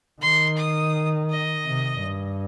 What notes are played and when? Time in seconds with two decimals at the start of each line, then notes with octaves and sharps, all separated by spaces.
0.22 D#3 C6
0.57 D#6
1.30 D#5
1.65 C3
2.02 G2